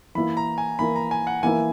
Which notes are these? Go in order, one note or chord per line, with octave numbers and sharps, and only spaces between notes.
E3 A#3 E4 A#4 B5
A#5
G#5
E3 A#3 E4 A#4 B5
A#5
G#5
F#5
E3 A#3 E4 A#4 G#5